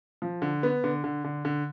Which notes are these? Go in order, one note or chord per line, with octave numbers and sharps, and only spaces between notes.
F3
D3
B3
D3
D3
D3
D3